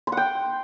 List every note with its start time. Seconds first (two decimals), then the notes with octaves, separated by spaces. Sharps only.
0.07 C6
0.12 F#5
0.17 G5